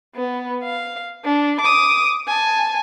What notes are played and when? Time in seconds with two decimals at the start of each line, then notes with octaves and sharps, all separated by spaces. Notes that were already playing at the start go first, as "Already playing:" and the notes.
0.15 B3
0.64 F5
1.25 D4
1.61 D6 D#6
2.28 G#5 A5